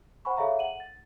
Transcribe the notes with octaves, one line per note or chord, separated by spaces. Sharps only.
C5 F#5 G#5 B5 C#6
G#4 A4 C#5 E5 F5 A#5
F#5 D#7 F#7
A6